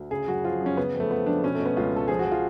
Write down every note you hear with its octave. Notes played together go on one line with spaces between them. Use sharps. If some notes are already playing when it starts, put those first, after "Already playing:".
Already playing: D2
C#3 G#4
F#2 F#4
F3 F4
F#2
C#4
C#3 B3
F2
A3
F3 B3
F2 D4
B2 C#4
B2 A3
B3
C#2 F4
C#2 A4
F3 G#4
F#4
F3
F4